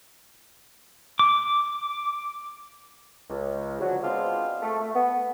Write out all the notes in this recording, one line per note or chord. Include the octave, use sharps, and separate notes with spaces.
D6
C#2
D3 F3 F#3
G#3 B3 C4 D4 F4
A3
A3
B3